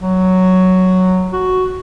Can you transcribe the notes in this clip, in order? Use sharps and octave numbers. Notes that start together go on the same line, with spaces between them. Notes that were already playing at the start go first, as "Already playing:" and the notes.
F#3
F#4